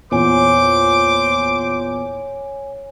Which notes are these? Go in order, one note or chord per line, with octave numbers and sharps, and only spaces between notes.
E2 A#2 C5 C#5 G#5 D6